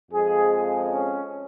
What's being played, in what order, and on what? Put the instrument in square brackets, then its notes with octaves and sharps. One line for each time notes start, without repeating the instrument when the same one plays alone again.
[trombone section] F2 F3 G#3 G#4
C#4